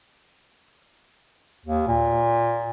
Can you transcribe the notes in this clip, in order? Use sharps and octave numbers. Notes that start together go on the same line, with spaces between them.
D#2
A#2